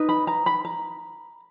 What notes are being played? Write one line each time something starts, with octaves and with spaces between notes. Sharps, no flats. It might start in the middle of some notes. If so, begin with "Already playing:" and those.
Already playing: D#4 B4
B5
A#5
B5
A#5